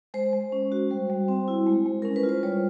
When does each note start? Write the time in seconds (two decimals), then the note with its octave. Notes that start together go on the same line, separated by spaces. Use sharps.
0.14 G#3 C5
0.33 G#3
0.52 C#4
0.72 F#4
0.91 G3
1.10 G3
1.28 C4
1.48 E4
1.67 G#3
1.86 G#3
2.02 C#4 A#4
2.16 B4
2.23 F4
2.29 C5
2.43 G3 C#5